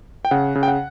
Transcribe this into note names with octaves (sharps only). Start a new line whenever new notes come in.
G5
C#3 F#5
C#3
G5
F#5